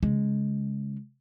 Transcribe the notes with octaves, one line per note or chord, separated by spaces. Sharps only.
C#3 G#3